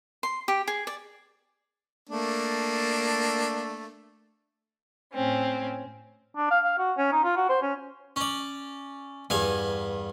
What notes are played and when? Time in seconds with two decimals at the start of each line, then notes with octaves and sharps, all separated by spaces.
0.23 C6
0.48 G4
0.68 G#4
0.87 D5
2.09 A3 A#3 D4
5.14 A2 C4 C#4
6.37 D4
6.50 F5
6.64 F5
6.78 F#4
6.97 C#4
7.12 D#4
7.24 F4
7.36 F#4
7.49 C5
7.62 C#4
8.16 C#4 D5
9.30 E2 G2 F5 G#5